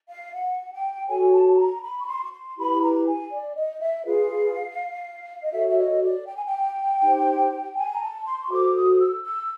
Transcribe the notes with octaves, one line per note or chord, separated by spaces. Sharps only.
F5
F#5
G5
F#4 A4 C#5 G#5
A5
A#5
B5
C#6
C6
C#6
C6
E4 G4 B4 B5
A#5
G#5
D5
D#5
E5
F4 G#4 B4 F5
D#5
F#4 A4 C#5 E5
E5
D#5
D5
G5
G#5
G5
D#4 G4 C5
G#5
A#5
A5
C6
C#6
F#4 A4 C5 D6
D#6
E6
E6